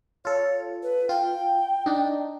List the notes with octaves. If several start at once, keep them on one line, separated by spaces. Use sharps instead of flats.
F4 A4 C#5
B4
F4 G5
D4 D#4